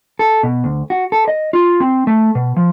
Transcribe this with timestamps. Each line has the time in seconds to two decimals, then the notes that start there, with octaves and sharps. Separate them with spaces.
0.19 A4
0.43 B2
0.64 D2
0.90 F#4
1.12 A4
1.28 D#5
1.53 F4
1.80 C4
2.07 A3
2.35 B2
2.57 F3